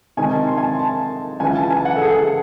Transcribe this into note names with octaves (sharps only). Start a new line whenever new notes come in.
C3 D#3 G#3 D#4 G#5
A5
C6
G#5
A5
A5
C#2 C#3 E3 G#5
A5
G#5
F#5
A4
G#4